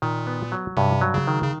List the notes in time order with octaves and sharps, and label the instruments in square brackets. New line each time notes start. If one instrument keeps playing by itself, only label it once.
[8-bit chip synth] A#2 [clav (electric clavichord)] D#3
[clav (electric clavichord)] B3
F#3
[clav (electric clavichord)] G2 [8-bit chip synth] C3
[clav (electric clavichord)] F#3
[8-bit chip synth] C#3
[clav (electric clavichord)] D#3
[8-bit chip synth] C#3